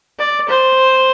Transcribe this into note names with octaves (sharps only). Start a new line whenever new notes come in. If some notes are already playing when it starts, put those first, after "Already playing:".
D5
C5